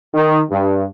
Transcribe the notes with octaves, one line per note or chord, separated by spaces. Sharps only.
D#3
G2